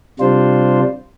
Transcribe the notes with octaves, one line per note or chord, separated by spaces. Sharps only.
C3 G3 D4 F4 C5